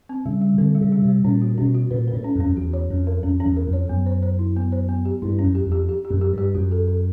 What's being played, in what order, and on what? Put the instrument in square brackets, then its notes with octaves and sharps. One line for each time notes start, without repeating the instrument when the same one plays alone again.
[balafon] C4
[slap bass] C#3 [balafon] G3
[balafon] G3
[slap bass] D3 [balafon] C4
[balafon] G3
[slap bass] C#3
[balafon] G3
[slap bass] C3
[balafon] G3
[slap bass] A#2 [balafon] C#4
[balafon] F#4
[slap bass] B2 [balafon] C#4
[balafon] F#4
[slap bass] A#2 [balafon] B4
[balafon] B4
[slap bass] A2
[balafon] C#4
[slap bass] F2
[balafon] C#4
[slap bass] F2
[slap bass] E2 [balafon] F#4
[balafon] C#5
[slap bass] F2 [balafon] C#4
[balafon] A#4
[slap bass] F2 [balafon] C#4
[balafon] C#4
[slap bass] E2
[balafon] A#4
[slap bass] F2
[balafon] C#5
[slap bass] F#2 [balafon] B3
[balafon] C5
C5
E4
B3
C5
B3
G4
[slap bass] G2 [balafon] E4
[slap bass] F#2 [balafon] C#4
[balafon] G4
[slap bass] F2
[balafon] G4
G4
G4
[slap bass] F#2
[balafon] G4
[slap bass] G2
[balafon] G4
[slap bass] F#2 [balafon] F#4
[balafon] A4
A4